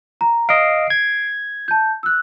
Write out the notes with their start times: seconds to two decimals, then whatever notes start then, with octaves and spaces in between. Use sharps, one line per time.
0.21 A#5
0.49 D#5 F5 C7 D7
0.90 G#6
1.68 A5 G6
2.03 E6 F#6